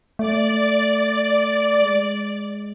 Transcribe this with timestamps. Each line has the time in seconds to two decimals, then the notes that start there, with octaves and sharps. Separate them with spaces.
0.19 A3 D5
1.82 G#3